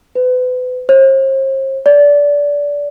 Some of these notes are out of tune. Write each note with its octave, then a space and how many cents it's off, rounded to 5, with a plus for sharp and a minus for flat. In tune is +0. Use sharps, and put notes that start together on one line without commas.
B4 +35
C5 +40
D5 -20